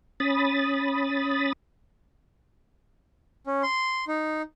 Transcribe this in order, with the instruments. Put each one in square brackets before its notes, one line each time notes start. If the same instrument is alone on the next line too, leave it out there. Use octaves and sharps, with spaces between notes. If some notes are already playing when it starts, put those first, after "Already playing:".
[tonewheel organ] C#4 B5 D#6 A6
[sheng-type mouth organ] C#4
C6
D#4